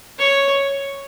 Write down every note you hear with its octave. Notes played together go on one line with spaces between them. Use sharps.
C#5